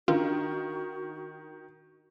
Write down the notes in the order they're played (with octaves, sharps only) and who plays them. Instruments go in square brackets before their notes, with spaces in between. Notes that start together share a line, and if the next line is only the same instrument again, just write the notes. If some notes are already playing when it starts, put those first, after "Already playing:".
[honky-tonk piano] D#3 [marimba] D4 [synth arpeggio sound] F4 [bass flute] F#4